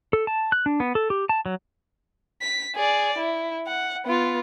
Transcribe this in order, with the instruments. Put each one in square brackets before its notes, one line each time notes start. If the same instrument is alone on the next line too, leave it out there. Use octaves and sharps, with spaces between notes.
[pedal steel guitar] A4
A5
F#6
D4
B3
A4
G4
A5
F#3
[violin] B6
G#4 D5
E4
F#5
B3 F4